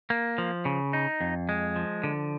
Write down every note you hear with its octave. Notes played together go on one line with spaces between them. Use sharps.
A#3
F3
C#3
D#4
F2
G#3
F3
D3